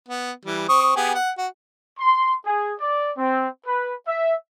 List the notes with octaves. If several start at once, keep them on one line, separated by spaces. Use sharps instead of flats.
B3
E3 G3
C4 C#6 D#6
B3 G4 G#4
F#5
F#4
C6
G#4
D5
C4
B4
E5